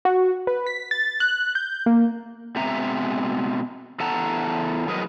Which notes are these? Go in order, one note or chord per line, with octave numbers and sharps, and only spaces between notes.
F#4
B4
B6
A6
F#6
G6
A#3
B2 G#3 C4 E5 A#5
E2 A4 F#5 A5 A#5
A2 F#3 G#4 A#4 B4 D#5